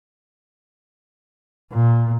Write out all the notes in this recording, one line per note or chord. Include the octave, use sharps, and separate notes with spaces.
A#2